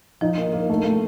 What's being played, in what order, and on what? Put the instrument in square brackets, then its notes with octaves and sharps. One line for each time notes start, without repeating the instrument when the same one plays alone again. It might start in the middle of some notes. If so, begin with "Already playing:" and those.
[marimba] F3 [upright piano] D#4
[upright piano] A#3
A#3
A3
A3